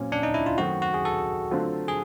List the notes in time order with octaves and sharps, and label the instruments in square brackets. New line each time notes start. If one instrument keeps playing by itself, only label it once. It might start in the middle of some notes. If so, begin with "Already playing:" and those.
Already playing: [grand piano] A#2 F#3 C4 [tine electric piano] C#4
[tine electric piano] D4
D#4
E4
F4
[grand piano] F#2 D#3 F#3 A3 C4 [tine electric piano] F#4
[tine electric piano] F#4
G#4
A4
[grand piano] D3 F#3 A3 C4 F4
[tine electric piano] G#4